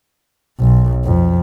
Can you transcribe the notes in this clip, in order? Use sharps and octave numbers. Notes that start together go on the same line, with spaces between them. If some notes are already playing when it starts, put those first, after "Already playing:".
B1
F2